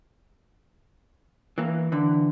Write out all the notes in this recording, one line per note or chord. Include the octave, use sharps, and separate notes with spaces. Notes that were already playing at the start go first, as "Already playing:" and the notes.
E3 A#3
D3 E3